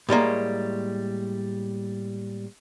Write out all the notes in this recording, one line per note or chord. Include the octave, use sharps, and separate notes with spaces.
A2 G3 G#3 A#3